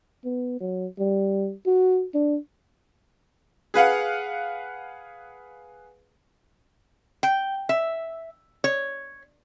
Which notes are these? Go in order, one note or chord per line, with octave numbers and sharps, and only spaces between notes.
B3
F#3
G3
F#4
D4
G#4 B4 F5 F#5
G5
E5
C#5